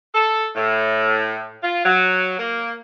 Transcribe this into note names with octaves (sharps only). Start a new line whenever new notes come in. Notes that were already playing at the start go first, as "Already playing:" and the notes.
A4
A2
F4
F#3
A#3